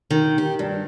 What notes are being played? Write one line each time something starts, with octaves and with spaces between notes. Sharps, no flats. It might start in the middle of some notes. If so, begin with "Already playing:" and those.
D#3
G4
G2